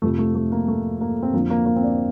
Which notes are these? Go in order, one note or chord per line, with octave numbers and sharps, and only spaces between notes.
F2 C3 F3 A3
A3
A3
A#3
A3
A#3
C4
F2 D3 F3 A#3
A#3
A#3
C4
D4